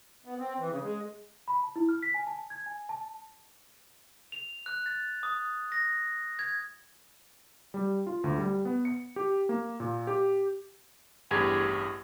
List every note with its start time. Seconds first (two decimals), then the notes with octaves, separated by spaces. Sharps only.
0.25 B3
0.39 C4
0.59 E3
0.70 C#3
0.83 G#3
1.48 B5
1.63 A5
1.76 E4
1.89 F6
2.03 B6
2.14 G#5
2.27 A5
2.50 G#6
2.66 G#5
2.89 A5
4.32 F7
4.66 F#6
4.86 A6
5.23 D#6
5.72 A#6
6.39 G#6
7.74 G3
8.07 F4
8.24 D2
8.38 G3
8.65 B3
8.85 C#7
9.16 G4
9.49 A#3
9.80 A#2
10.07 G4
11.31 A1 E2 G2 G4 G#4 G#6